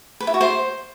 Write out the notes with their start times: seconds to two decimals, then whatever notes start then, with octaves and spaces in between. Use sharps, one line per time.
0.20 B4
0.27 E4
0.34 F#4
0.41 C5